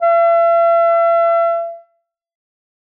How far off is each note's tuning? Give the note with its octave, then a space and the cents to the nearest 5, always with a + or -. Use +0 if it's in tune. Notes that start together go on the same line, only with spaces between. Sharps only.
E5 +40